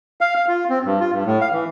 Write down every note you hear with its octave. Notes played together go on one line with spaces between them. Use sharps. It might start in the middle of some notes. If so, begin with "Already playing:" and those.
F5
F5
F4
C4
G2
F4
G2
A2
F5
E3